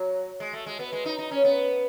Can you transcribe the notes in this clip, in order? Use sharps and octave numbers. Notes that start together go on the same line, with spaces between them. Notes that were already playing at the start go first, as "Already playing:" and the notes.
Already playing: F#3
G#3
A3
G#3
B3
G#3
D#4
D#4
C#4
B3